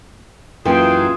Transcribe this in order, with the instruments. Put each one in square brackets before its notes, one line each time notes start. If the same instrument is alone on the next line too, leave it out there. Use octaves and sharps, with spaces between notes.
[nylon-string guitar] F#2 E3 A#3 [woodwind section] F4 G#4 [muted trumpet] G5